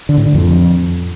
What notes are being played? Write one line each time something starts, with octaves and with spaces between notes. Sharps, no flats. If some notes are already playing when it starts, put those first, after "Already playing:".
D3
A2
D3
F2